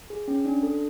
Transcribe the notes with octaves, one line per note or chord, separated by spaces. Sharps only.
G#4
C#4
D4
A4